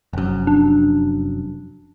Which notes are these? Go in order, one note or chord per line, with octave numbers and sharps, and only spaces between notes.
F1 F#2
D4